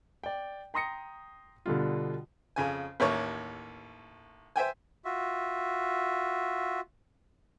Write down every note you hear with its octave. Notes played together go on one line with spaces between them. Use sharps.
D5 G5
G5 A#5 C6 D#6 A#6 C#7
B2 D3 G3 F4
F2 C#3 G#5
A1 D#2 A#4 C#5 C#6
C5 E5 G5 G#5
F4 F#4 E5